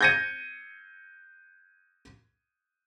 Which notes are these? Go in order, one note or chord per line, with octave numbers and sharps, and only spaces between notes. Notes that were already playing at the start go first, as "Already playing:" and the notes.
G6 G#6 A#6 C#7 D#7